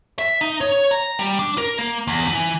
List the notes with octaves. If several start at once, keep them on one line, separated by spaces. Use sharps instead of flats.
E5
D#4
C#5
A#5
G3
D4
A#4
A#3
E2
E3